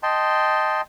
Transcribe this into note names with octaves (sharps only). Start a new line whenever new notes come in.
D#5 G5 A5 C6